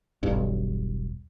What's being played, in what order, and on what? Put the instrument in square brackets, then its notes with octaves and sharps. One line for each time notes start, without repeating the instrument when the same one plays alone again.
[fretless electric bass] E1 B1 G2